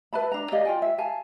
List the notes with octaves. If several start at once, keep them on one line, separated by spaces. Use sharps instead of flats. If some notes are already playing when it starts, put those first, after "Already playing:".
B4 E5 A5 B5
D4 A#5
G4 D5 D#5 F5
F4 G5 G#5
E5
F5 G#5 A5